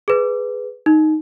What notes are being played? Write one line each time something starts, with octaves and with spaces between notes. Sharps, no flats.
G#4 B4
D#4